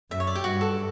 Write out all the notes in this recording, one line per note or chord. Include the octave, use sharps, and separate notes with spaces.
F#2 E5
C#5
D5
G4
G2 F#4
A4